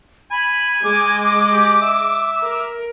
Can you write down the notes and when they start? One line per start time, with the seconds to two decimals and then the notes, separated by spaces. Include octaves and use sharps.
0.31 G#5 B5
0.84 G#3 G#4 D#5 D6
1.52 G4
1.82 E5
2.43 A#4